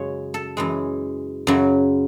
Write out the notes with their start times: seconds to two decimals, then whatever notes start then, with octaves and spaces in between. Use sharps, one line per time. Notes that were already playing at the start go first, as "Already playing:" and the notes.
Already playing: F#2 C#3 G#3 C#5
0.34 A4
0.57 F#2 E3 G#3
1.47 F#2 C#3 F#3